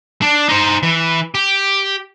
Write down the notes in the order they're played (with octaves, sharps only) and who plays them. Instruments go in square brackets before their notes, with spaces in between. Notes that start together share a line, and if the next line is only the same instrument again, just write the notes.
[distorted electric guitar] D4
D#4 C5
E3
G4